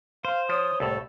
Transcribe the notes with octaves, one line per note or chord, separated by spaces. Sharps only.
C5 F5
F3 C#5 D#6
C2 A2 A4